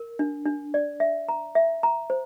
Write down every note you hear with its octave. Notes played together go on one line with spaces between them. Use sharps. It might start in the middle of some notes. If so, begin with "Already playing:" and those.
Already playing: A#4
D4
D4
D5
E5
A#5
E5
A#5
C5